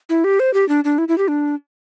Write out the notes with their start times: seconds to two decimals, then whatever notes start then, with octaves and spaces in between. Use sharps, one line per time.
0.09 E4
0.24 G4
0.40 C5
0.54 G4
0.69 D4
0.84 D4
0.98 E4
1.08 E4
1.18 G4
1.28 D4